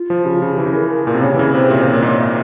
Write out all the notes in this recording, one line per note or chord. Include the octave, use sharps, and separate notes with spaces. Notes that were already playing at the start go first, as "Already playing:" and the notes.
Already playing: F4
F3
C#3 G4
F4
C#3 G4
E3 G#4
C#3
E3 A#4
A#4
A#2 A#4
C3
C#3 C#5
E3
C#3 C#5
C3 C5
A#2 E5
C5
C#5
A#2
G#2 C#5
A#2 E5